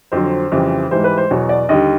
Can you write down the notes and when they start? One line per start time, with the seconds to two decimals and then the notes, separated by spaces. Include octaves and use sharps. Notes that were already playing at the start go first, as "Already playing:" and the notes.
0.12 F2 D3 F#3 C5
0.52 F2 C#3 E3 G3
0.91 G#2 E3 G3 C5
1.04 B4
1.17 C5
1.30 E2 B2 F#3 C#5
1.49 D5
1.69 D#2 D3 G3 D#5